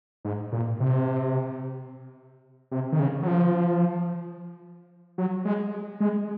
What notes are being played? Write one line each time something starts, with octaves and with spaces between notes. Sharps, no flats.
G#2
A#2
C3
C3
D#3
C#3
F#3
F3
F#3
G#3
G#3